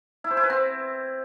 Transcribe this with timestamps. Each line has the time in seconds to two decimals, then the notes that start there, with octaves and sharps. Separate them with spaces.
0.24 E4
0.31 C5
0.37 E4
0.43 B4
0.50 C4